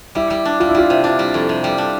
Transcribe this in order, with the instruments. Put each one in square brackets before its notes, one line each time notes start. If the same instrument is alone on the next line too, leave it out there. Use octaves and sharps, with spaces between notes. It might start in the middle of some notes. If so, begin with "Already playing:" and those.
[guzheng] G3 [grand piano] E4
[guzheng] G3
D4
[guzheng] G3 [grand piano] F4
[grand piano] E4
[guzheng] G3 [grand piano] F4
[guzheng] C3
D4
G3
F2
C3
G3
D4